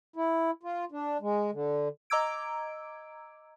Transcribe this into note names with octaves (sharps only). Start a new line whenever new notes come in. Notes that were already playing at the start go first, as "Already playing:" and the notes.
E4
F4
D4
G#3
D3
D#5 A#5 D6 E6 G#6 D7